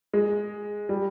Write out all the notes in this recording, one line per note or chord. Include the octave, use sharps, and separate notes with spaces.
G#3
G3